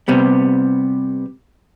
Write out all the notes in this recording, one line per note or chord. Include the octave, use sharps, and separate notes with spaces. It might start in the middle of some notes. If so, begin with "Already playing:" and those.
C3 G3 B3